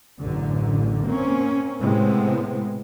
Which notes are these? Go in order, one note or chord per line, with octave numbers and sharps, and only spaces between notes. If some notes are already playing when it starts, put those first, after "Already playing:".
A1 F#2 D3
A#3 C4 C#4
A2 C3 G#3 B3 C4